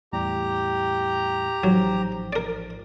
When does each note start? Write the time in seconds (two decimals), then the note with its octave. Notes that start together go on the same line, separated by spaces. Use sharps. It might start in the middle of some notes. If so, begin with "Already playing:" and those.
0.13 E2 A2 G3 G4 A#5
1.64 A1 G#2 F3 F#3
2.33 A#4 D5